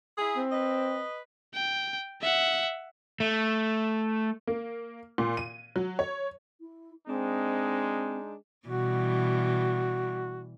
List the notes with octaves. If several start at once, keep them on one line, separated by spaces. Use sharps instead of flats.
E4 G#4
C4
B4 D#5
G5
E5 F#5
A3
A#3
A#2
D#7
F#3
C#5
E4
G#3 C4 D4 D#4
B2 E3 G3 F#4